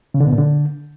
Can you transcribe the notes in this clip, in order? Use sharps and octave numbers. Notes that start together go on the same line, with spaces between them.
C#3
D3
B2
A#2
D3